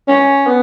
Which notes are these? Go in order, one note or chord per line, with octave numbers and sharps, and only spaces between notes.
C#4
B3